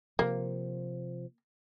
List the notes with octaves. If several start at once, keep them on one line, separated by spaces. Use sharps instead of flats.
C3 F3 A#3